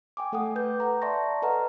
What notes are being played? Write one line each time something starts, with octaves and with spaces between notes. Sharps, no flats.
G5 G#5 D6
A3 A4 F#5 D6 D#6
B4 G6
F#5 A#5
D5 E5 A5 C6 C#6 A#6
A4 B4 D#5 F#5 A#5 F6